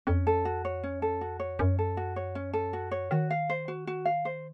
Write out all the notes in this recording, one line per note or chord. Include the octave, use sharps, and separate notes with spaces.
F2 C#4
A4
F#4
C#5
C#4
A4
F#4
C#5
F#2 C#4
A4
F#4
C#5
C#4
A4
F#4
C#5
D#3 F#4
F5
C5
F#4
F#4
F5
C5